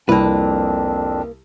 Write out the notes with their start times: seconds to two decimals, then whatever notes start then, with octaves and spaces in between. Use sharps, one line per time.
0.09 C2 F2 A#3 C4 D4 B4